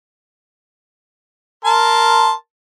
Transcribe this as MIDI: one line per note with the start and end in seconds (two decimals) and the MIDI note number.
1.64 2.32 70
1.64 2.32 81
1.64 2.32 84